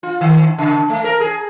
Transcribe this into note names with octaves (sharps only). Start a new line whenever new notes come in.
F4
D#3
C#3
A3
A#4
G#4